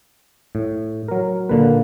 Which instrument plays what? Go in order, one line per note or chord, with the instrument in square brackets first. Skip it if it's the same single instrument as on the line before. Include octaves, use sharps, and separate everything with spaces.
[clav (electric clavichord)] A2
F#3 A#4
[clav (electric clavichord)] A#2 D3 B4 [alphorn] A#3